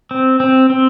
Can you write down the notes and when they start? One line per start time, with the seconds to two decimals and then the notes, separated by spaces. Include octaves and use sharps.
0.11 C4
0.40 C4
0.70 C4